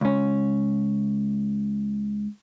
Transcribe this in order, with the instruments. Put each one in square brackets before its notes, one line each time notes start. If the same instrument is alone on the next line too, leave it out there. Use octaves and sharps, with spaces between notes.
[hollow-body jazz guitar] C#2 C#4